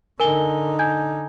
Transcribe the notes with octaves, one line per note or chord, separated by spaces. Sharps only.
D3 D#4 A#4 G#5 G7
G#5 G6 G#6